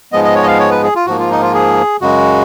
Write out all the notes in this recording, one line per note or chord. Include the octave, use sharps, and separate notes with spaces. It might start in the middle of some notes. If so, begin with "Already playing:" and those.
G#2 F3 G#3 B3 D#5
D#5
C#5
D#5
F5
C#5
B4
G#4
F4
G#2 F3 A#3 F#4
F4
D#4
F4
G#4
F#2 C#3 G#3 F#4